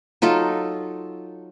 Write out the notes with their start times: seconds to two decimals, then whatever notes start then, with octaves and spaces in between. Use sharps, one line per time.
0.22 F#3 D#4 F4 A4